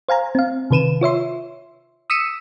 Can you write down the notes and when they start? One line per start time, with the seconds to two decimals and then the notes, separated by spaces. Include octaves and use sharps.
0.09 C5 F5 G#5 A#5
0.35 C4 F5
0.71 C3 D#3 B4 D#7 E7
1.01 F4 C#5 E5 C6
2.10 D#6 E6 B6 C#7 D#7 E7